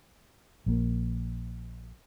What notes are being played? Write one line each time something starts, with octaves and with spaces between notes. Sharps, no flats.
A#1 A#3